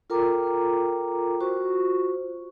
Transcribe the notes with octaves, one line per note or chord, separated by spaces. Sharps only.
F4 A4 A#4 G5 A#5 D6
F4 F#4 C5 C#6